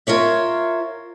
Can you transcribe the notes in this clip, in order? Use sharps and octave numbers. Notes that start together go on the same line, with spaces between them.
F4 A#4 C#5 E5